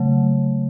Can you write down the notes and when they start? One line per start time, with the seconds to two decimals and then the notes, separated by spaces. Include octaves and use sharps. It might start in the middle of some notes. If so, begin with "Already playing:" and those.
Already playing: C#3 F#3 A3